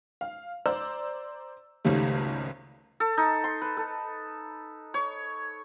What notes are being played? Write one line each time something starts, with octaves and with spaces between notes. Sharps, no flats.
F5
C5 D5 A#5 E6
G#1 C#2 G#2 C#3 G3 A3
A4
D#4
C6
B4
A4
C#5